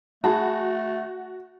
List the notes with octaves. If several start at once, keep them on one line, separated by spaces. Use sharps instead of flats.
A3 F#4 G#4 A5 B5